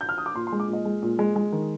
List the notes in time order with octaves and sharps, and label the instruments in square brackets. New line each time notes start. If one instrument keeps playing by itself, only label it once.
[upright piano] G6
F6
D#6
D6
A#2 C6
C6
G#3
D6
A#2
D#5
G#3
A#2
G#3
G#3
D#3